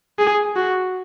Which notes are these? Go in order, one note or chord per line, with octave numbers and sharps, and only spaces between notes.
G#4
F#4